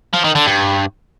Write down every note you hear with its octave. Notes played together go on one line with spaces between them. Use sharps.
F3
D#3
D3
G2